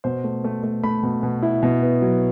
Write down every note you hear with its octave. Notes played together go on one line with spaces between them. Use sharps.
B2 C5
A3
A3
A3
A3 B5
B2
B2
E4
B2
B3
F#3